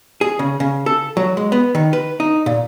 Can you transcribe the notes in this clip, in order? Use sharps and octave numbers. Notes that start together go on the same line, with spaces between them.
G#4
C#3
C#3
A4
F#3
G#3
B3
D#3
B4
D#4
A#2